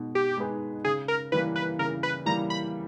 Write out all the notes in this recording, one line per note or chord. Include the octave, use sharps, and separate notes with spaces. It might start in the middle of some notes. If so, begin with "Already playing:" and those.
Already playing: B2 G#3 D#4
G4
G#3 D#4 G#4 B4
C#3 G#4
A#4
E3 G3 A#3 B4
B4
C#3 A#4
B4
E3 G3 A#3 A#5
B5